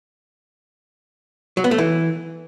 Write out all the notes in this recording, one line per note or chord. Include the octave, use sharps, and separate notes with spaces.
F#3
B3
A3
E3